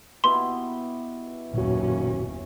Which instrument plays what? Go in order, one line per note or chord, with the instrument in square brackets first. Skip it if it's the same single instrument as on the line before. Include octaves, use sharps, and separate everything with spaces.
[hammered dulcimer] B2 E4 G4 [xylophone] C6
[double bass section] F#1 D#2 C#4 [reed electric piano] A#2 F#4